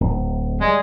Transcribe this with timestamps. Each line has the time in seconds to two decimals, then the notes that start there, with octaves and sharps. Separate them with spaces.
0.01 D1
0.61 G3 G#3